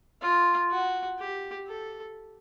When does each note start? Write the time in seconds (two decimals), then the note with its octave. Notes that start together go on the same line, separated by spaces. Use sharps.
0.22 F4
0.71 F#4
1.19 G4
1.68 A4